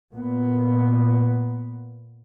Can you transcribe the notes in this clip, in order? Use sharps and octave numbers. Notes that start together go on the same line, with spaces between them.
A#2 B3